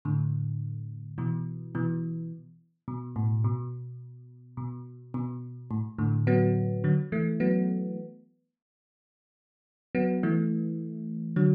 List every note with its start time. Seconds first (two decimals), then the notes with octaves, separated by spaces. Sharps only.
0.05 A2 D3
1.18 B2 E3
1.75 B2 E3
2.88 B2
3.16 A2
3.44 B2
4.57 B2
5.14 B2
5.71 A2
5.98 A2 D3
6.27 F#3 B3
6.84 D3 F#3
7.12 E3 A3
7.40 F#3 B3
9.95 F#3 B3
10.23 E3 A3
11.36 D3 F#3